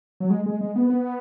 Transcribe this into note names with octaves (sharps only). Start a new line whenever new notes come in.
F#3
G#3
G#3
G#3
B3
B3